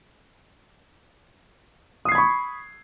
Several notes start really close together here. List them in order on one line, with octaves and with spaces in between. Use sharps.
D#6 C7 G#6 B5 C#6